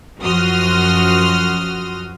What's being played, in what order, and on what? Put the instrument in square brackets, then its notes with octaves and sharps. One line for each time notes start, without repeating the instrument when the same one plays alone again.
[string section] F#2 F3 F#4 C6 D#6 F6